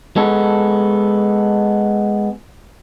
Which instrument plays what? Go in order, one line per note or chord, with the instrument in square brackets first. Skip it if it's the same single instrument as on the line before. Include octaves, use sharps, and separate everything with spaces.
[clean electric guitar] G#3 B3 A4